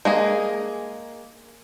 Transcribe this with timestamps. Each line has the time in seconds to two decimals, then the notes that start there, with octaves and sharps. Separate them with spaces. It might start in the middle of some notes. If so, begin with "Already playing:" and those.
0.05 G#3 A#3 G#4